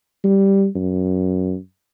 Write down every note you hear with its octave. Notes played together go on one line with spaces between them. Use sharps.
G3
F#2